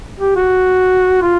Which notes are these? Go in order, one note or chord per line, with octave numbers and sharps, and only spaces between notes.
G4
F#4
F4